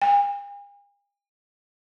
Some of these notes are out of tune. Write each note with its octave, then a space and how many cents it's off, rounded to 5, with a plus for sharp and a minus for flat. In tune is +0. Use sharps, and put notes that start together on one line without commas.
G#5 -45